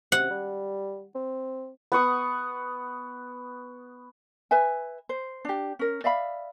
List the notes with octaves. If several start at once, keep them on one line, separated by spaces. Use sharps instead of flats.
C3 F#5
G3
C4
B3 F#5 C#6 D#6
B4 E5 G#5
C5
D4 G4
C#4 A#4
D5 E5 F5 B5